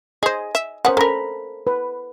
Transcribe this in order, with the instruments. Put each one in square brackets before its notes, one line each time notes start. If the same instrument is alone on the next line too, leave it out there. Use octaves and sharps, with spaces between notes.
[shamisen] G#4 C5 [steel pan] D#5 G#5
[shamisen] E5
[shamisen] B3 C#4 F#5 [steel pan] A#4 C5
[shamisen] C#4 A#4 [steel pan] A4 A#5 B5
[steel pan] B4